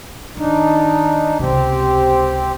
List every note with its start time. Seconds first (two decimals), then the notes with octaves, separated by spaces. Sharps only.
0.37 D#3 D4 D#4
1.39 C#2 C3 C4 G4